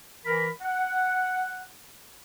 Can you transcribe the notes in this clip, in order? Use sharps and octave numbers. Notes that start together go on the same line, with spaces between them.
E3 A#4 B5
F#5